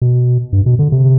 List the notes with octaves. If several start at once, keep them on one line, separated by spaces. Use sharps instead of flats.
B2
G2
B2
D3
C3